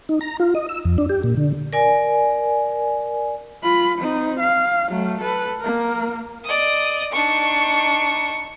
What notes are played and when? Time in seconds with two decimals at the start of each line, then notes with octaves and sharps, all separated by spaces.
0.09 D#4
0.21 A#5
0.40 F4
0.55 D#5
0.69 E6
0.85 F2
0.98 D4
1.09 G4
1.24 A#2
1.37 D3
1.73 A#4 D5 G#5
3.62 F4 B5
3.99 C4 D#4
4.40 F5
4.90 F#3 A3
5.21 A4 B4
5.60 A#3 A#4
6.44 D5 D#5 D#6
7.11 D4 D#4 C#6